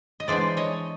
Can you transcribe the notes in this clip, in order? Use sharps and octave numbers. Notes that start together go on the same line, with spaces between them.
D#5
E3 G#3 B3 D4 C5 D5
C#5 D#5